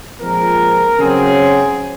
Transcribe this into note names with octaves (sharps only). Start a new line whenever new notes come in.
A#2 F3 G#3 C4 A#4
C#3 F#3 C4 G#4